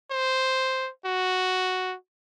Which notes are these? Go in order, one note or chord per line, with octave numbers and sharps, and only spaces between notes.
C5
F#4